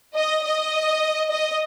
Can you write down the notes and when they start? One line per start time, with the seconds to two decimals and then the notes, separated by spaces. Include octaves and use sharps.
0.16 D#5
0.45 D#5
1.30 D#5